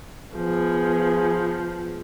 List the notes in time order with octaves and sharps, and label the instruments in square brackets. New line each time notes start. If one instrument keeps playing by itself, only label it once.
[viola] F3 [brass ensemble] B3 G#4